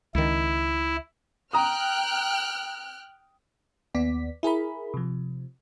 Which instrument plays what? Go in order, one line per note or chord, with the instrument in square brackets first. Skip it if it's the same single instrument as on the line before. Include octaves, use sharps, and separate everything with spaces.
[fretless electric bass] C#2 D#3 [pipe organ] E4
[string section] G5 F6 F#6 [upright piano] A#5 D#6
[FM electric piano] D#2 B3 D5 B6
E4 G#4 A#4 B5
C3 F3